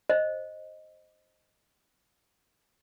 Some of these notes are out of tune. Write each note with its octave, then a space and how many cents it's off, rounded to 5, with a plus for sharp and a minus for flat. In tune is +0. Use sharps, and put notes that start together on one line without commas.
C5 +10 D#5 +0